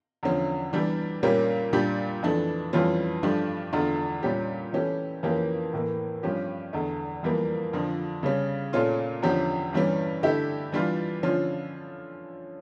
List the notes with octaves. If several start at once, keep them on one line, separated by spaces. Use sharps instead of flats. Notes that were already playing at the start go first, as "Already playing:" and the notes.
E2 D3 F3 C#4
E3 G3 D4
A#2 G3 A#3 C#4 G4
A#2 G3 D4 G4
F2 E3 A3 D4
F2 E3 G3 C#4 F4
G2 F3 A3 D4 G4
E2 D3 A3 D4 F4
A#2 G3 C#4 G4
E3 A3 C#4 G4
F2 E3 A#3 C#4 G4
A2 E3 A#3
G2 F3 C#4 G4
E2 D3 A3
F2 E3 G3 A#3
F2 D3 F3
C#3 G3 C#4
A#2 A3 C#4 F4
E2 D3 F3 C#4 G4
G2 E3 G3 C#4
D3 A3 E4 G4
E3 G3 D4 F4
D3 F3 C#4 F4